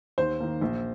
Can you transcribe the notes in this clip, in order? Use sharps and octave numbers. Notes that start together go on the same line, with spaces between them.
D#2 C5
D#3 A#3
A#1